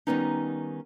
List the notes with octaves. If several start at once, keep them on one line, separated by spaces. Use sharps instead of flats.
D#3 G3 G#3 B3 C#4 D#4